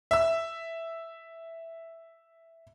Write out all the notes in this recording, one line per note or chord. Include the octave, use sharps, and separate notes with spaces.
E5 E6